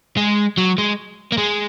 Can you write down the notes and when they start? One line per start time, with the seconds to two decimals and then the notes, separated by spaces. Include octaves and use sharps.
0.17 G#3
0.57 F#3
0.78 G#3
1.32 A#3
1.38 G#3